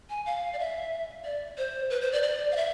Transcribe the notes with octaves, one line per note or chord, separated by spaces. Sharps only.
G#5
F5
D5
E5
D5
C5
B4
C5
D5
D5
F5
E5